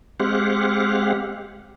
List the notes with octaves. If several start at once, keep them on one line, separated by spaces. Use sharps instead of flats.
G#3 C4 G4 F5 F#5